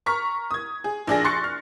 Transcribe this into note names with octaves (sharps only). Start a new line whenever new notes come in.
A#5 C#6 F6 B6
D#6 G#6
G#4
A#1 D4 G#4 A#6
C6 C#6 F#6 A6 C7 C#7
F6